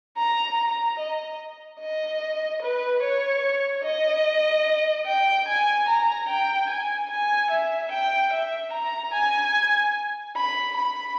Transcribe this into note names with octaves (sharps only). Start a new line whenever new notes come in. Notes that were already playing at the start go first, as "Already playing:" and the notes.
A#5
A#5
D#5
D#5
B4
C#5
D#5
G5
G#5
A#5
G5
G#5
G#5
E5
G5
E5
A#5
G#5
B5
B5